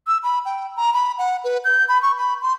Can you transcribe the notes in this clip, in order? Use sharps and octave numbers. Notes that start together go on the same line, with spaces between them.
E6
B5
G5
A#5
B5
F#5
B4
G6
B5
C#6
B5
C6